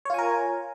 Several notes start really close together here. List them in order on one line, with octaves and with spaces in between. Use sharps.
C#5 F4 G#5 A#4